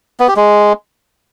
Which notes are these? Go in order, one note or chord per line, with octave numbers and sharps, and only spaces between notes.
B3
G4
G#3